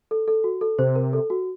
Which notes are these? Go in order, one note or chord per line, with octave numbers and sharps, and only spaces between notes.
A4
A4
F#4
A4
C3 C5
A#4
A4
F#4